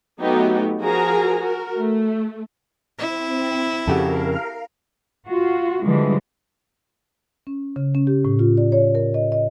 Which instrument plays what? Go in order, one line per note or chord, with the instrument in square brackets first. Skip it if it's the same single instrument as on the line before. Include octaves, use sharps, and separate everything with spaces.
[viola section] F#3 A3 B3 D#4 F#4 G4
F3 F#4 G#4 A#4 G#5 A#5
F#4 A#4
A3
[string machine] C4 [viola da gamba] E4
[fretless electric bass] F2 C#3 [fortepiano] F#4 G4 A4 [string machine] A#4 F5
[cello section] F4 F#4
D3 E3 F3 G3 G#3
[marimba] C#4
C#3
C#4
G4
A2
F4
D5
C#5
A#4
D#5
D#5